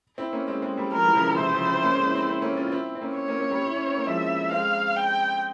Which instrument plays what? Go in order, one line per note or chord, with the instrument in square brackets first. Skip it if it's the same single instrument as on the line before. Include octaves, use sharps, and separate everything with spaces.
[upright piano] C4 E4
A#3 C#4
G#3 C4
G#3 C4
G3 A#3
[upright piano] F3 G#3 [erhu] A#4
[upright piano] E3 G3
C#3 F3
C3 E3
[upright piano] C3 E3 [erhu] C5
[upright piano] C#3 F3
C4 E4
A#3 C#4
G#3 C4
C4 E4
C4 E4
C4 E4
A#3 C#4
C#4 F4
F4
C4 E4
C4
A#3 C#4
[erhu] C#5
[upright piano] A#3 C#4
A#3 C#4
G3 A#3
E4
C#4
C4
A#3
[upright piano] F3 G#3 [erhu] E5
[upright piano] G#3 C4 [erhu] F5
[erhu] G5